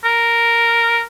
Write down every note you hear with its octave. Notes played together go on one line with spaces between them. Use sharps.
A#4